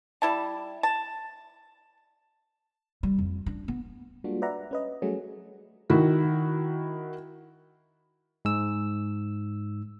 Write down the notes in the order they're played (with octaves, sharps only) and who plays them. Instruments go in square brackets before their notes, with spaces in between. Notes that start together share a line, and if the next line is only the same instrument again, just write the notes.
[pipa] G3 E4 A5
A5
[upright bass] G3
F2
D4
B3
[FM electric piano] G3 G#3 A#3 D4 F4 F#4
B4 D5 E5 F#5 A#5
C#4 B4 D#5
F#3 G3 A3 C#4 F#4 G#4
[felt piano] D#3 E4 F#4
[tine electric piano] G#2 E6